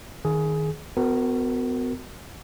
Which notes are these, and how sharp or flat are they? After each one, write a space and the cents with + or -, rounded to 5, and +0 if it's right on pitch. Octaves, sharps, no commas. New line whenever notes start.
D#3 +0 G#4 +15
B3 +35 F#4 +0 A#4 -20